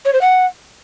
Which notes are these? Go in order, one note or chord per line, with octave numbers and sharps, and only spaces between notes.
C#5
C5
F#5